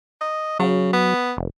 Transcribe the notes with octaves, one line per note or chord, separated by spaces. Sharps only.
D#5
C#3 F#3
B3
F1